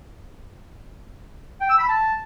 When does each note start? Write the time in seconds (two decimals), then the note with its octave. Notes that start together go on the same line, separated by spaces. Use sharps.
1.59 G5
1.69 E6
1.78 B5
1.88 A5